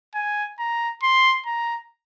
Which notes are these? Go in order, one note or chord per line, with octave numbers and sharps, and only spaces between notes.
G#5
A#5
C6
A#5